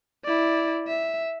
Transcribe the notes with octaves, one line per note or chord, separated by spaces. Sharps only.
E4 D5
E5